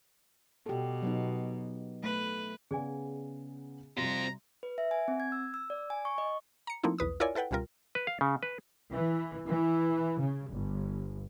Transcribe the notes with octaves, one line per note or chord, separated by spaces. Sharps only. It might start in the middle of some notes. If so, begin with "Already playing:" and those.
B2 G4 A4
F#3 B3 D#4
A3 B4
C#3 B3 G#4 D5 G#5
C3 G3 C4 F4 F#4 A#5
B4
E5
G#5
C4
G#6
E6
E6
D5
G#5
C#6
D#5
A#5 C#7
F3 A3 A#3 C4 D#4 E4
B1 E2 B4 D#6
E4 F4 A#4 C#5 D5 G#5
E4 A4 B4 F#5 G5
C#2 B2 G3 F4 A#4
B4
F5
C#3
B4
E3
E3
C#3
G1